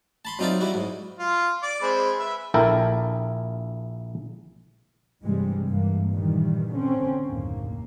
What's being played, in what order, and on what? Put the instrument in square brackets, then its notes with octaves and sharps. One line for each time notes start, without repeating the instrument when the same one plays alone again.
[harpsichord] A5 B5 C6
F#3 C4 D#4 F4 D5 E5
F#3 G3 E4 F#4
G#2
[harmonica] F4
D5 D6
G#3 C4 B5
B4 E5
[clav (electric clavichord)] A#1 E4 A4 A#4 G5
[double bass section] G2 C3 E3 G3 G#3
G2 E3 A#3
A#2 D#3 E3 G3
D3 C4 C#4
F#1 D#2 A2 A#3